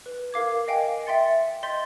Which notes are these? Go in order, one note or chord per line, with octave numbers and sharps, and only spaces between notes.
B4
A#4 F5 D6 G#6
D#5 F5 G5 G#5
E5 G5 C6 A6 C#7
D#5 C6 G6 A6 B6